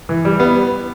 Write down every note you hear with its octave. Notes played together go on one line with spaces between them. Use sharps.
E3
G3
B3